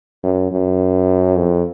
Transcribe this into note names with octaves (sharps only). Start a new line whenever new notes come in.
F#2
F#2
F2